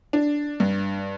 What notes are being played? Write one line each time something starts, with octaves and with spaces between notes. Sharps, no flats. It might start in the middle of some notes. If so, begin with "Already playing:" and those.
D4
G2